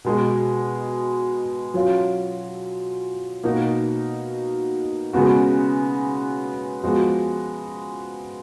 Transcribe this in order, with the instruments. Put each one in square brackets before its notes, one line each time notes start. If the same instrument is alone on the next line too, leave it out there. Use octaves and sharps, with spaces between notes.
[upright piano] B2 G#3 B3 F#4
F#3 C#4 F4
B2 A#3 D#4 F#4
C#3 G#3 B3 F#4
F3 G#3 B3 F#4